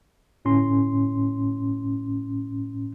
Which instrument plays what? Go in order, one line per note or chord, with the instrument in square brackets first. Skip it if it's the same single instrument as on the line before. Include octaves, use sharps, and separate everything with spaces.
[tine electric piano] G1 A2 C#4 C6